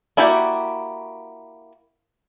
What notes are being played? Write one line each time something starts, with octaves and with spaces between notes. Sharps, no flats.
A#3 E4 F#4 G4 D5